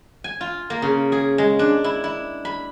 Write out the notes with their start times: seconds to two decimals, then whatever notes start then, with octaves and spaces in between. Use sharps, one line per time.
0.24 G#5
0.41 F4
0.70 A#3
0.82 C#3
1.12 G#4
1.38 G#3
1.59 D4
1.84 E4
2.04 E4
2.45 B5